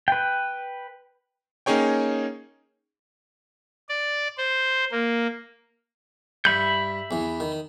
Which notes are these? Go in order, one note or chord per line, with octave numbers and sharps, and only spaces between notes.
B4 G5
A#3 C#4 D#4 G#4 C#5 G5
D5
C5
A#3
G2 E5 B5 G6
E2 E3
D#3